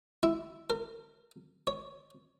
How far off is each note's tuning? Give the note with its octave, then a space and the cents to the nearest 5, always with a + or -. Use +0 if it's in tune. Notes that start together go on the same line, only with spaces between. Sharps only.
E4 +5
A#4 -35
C#5 +5